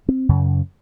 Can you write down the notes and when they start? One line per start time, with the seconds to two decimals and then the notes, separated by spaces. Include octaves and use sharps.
0.08 C4
0.29 F#2 C#3